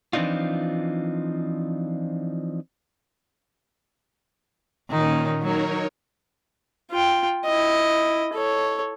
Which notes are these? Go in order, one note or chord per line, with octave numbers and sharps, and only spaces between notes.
E3 F3 C4 D4 D#4 F4
A#2 D#3 C#4 D#4
F#3 D#4 A#4 C#5
F4 G5
E4 D#5
A4 C#5